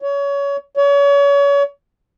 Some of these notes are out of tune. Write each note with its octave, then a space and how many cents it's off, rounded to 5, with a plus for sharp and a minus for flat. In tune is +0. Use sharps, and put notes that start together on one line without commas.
C#5 +25
C#5 +35